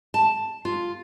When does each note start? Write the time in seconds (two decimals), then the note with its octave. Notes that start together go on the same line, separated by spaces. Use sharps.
0.14 A5
0.65 F4